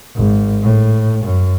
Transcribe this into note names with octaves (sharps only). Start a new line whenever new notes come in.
G#1
A2
F#2